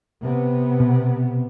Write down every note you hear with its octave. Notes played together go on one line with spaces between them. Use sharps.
C3 B3
B2